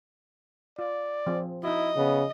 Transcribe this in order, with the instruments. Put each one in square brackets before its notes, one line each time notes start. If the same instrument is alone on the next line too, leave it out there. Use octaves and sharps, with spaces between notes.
[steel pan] F4 [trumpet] D5
[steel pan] F3 C4 G#4
[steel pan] D#4 F#4 [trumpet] E4 [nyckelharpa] D#5
[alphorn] C#3 [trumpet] B3